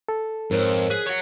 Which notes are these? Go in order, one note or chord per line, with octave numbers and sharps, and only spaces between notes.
A4
F2 G#2 A#4 C5 C#5
G#4 F#6 B6
C#5 F#5